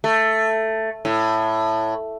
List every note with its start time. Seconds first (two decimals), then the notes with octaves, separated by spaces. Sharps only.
0.04 A3
1.05 A2